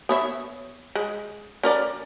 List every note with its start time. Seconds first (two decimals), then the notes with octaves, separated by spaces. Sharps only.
0.09 B3 C#5 E5
0.95 G#3
1.63 C#4 A#4 D5